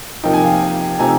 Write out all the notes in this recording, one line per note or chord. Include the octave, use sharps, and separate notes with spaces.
C3 F3 A#3 D#4 G5
G#5
F5 G5
C3 F3 A3 C4 D#4 G#5 A#5